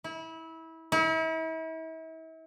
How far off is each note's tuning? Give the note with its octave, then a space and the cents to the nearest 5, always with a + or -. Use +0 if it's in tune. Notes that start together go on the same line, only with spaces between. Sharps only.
E4 -25
E4 -40